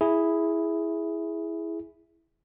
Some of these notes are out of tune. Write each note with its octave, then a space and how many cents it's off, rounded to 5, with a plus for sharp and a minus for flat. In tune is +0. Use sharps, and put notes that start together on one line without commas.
E4 +0 G#4 +0